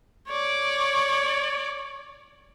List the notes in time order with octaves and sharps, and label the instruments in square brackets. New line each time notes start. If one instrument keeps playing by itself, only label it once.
[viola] C#5 D5